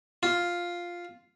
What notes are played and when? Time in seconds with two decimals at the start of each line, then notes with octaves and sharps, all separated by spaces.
0.23 F4